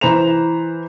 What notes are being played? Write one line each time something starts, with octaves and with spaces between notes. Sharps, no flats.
E3 B4 C5 A#5 E7 F7